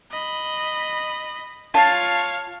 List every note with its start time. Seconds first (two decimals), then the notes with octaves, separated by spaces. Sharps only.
0.11 D#5 B5
1.74 F4 C#5 F5 A5